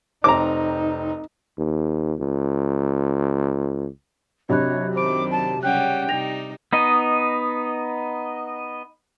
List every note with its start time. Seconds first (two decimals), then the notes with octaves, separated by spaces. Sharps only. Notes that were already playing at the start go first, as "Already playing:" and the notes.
0.24 F1 C4 D#4 A#5 D6
1.58 D#2
2.20 C#2
4.49 F#2 C3 D4 C#5 D#5 B5 F#6
4.95 D#3 C5 B5 D6 D7
5.30 A5
5.63 C#3 G3 C#4 F#5 G5 F#6
6.09 C3 G3 D#4 A#6 F7
6.73 B3 D#4 D#5